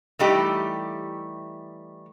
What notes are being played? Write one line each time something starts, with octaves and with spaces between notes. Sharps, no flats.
E3 G3 A3 D#4 G4